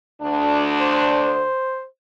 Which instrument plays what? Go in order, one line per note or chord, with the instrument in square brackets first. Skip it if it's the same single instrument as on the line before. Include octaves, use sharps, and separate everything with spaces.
[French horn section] D2 D4
[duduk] C5